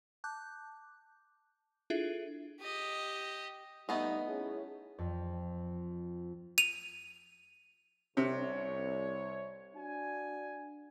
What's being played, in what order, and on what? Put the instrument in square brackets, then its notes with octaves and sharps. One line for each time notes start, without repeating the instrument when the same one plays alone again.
[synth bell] A5 D6 F#6 G6
D4 E4 F4 G#4 A4 E5
[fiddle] G4 D#5
[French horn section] G2 D#4 [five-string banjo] A3 B3 D#5
[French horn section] C#4 E4 G#4
[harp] F2
[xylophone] D#7 F7
[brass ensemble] C2 C#5 [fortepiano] C3
[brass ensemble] D4 F#4 G#5